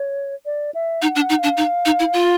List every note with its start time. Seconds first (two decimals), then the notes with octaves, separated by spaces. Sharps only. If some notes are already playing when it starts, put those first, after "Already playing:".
Already playing: C#5
0.46 D5
0.74 E5
1.02 D#4 F#5
1.15 D4
1.21 F#5
1.30 D#4
1.39 D4 F5
1.57 D#4
1.86 D#4
1.99 E4
2.13 F4